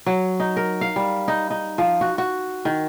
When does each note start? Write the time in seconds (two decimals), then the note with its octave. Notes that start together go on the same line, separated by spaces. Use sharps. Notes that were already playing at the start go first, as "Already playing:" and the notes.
0.06 F#3
0.40 D#4
0.56 A#4
0.81 F5
0.96 G3
1.28 D#4
1.51 D#4
1.78 F3
2.01 F#4
2.18 F#4
2.65 D#3